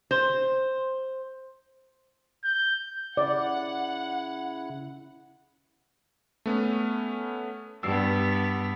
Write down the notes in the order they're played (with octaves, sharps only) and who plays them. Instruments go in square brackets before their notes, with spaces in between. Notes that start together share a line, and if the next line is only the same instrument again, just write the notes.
[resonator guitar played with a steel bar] C5
[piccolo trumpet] G6
[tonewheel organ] C#3 E4 [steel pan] D5 [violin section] F#5
[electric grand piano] A3 B3 C#4
[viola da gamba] G2 B3 [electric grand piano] E6 C7